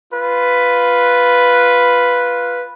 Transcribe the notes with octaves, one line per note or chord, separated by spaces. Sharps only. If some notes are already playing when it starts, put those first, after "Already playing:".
F4 B4